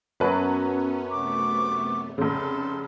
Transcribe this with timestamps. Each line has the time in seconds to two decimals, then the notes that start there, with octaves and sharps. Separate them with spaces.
0.20 F#2 F#3 B3 C#4 B4 A5 B5
1.11 C3 A3 B3 C#6 D6
2.18 F1 C#3 A4 C6